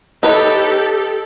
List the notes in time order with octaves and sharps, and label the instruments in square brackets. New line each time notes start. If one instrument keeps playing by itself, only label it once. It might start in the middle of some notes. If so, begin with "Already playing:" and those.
[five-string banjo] D#4 B4 C#5 [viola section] G4 A4